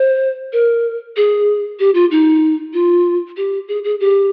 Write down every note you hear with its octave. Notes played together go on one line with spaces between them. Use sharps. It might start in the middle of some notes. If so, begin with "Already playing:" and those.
Already playing: C5
A#4
G#4
G4
F4
D#4
F4
G4
G#4
G#4
G4